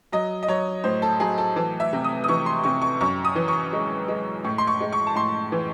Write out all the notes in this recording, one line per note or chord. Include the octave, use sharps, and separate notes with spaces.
F#3 D#5
D#5
F#3 C#5
A2 C5
A4
F#3 G#4
A4
E3 A4
E5
C3
D#6
D#6
E3 C#6
C6
C3 C#6
C#6
F#2 C#6
D#6
E3
C#6
G#3
G#3
A2 C#6
C6
C#6
G#3
C#6
A5
A2 C6
E3